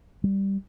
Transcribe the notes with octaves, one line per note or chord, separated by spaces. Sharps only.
G3